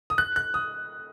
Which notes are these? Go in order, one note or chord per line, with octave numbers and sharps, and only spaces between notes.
D#6
F#6
F#6
D#6